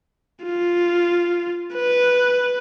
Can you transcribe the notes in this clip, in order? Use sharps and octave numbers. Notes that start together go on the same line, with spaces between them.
F4
B4